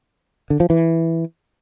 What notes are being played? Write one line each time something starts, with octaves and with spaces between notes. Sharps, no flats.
D3
F3
E3